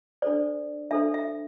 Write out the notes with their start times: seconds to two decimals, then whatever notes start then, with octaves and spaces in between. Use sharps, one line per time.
0.22 D4 A4 C5 D5
0.91 D4 A4 C5 E5
1.14 E5